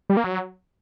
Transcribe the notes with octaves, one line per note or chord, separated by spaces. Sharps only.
G3
A#3
F#3